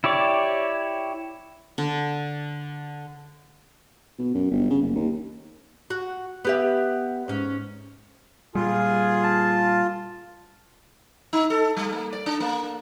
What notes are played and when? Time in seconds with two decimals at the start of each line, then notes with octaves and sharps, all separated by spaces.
0.04 E4 G4 C#5 D5
1.78 D3
4.19 B2
4.34 F#2
4.51 G1
4.70 C#3
4.82 F#1
4.96 D#2
5.90 F#4
6.45 B3 G4 E5
7.28 G#2 C#4
8.55 A#2 G3 F4 G#4
9.24 A5
11.33 D#4
11.50 A4
11.77 G3
11.92 A#3
12.13 D5
12.26 D4
12.40 A#3